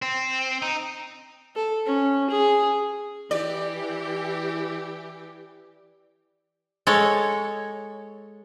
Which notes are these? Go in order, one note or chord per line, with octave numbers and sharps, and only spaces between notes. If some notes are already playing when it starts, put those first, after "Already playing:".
C4
D#4
A4
C#4
G#4
E3 G4 D5
G#3 A4 C#5